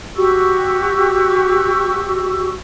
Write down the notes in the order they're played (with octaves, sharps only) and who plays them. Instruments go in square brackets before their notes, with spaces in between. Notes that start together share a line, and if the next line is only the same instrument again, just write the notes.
[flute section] F#4 G4 C#6 E6